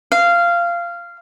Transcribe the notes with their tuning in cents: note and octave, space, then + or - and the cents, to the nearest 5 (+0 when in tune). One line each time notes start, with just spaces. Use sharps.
F5 -15